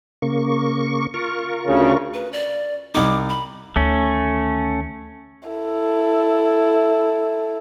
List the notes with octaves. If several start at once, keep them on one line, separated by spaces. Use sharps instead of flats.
C#3 A#3 C#6
F4 A#4 C#6
D2 C#3
B4
D5
C2 D#4 D6
B5
D2 D#3 A3 C#4
E4 A4